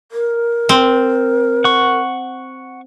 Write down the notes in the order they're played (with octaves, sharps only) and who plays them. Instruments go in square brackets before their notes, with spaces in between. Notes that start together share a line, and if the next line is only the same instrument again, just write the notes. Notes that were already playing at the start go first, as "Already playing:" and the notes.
[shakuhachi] A#4
[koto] C4
[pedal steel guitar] F#5 C#6